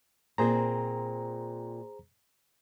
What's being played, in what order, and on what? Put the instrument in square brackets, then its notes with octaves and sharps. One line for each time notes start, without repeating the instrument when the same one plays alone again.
[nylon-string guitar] A#2 C4 [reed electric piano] G#4 C5 A#5